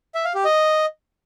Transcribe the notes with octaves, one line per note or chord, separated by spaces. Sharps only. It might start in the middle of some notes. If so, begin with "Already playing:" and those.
E5
F5
G4
D#5